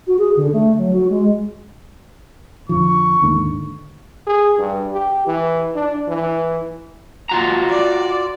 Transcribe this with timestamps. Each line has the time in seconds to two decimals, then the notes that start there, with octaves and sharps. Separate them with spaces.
0.07 F#4
0.18 G#4
0.36 D3
0.53 A3
0.78 F#3
0.93 F#4
1.09 G#3
2.69 F2 D3 F3 C#6
3.22 D#2 G#2 D3
4.27 G#4
4.58 G2
4.93 G4
5.27 E3
5.75 D4
6.08 E3
7.29 F4 F#4 A#5
7.69 D5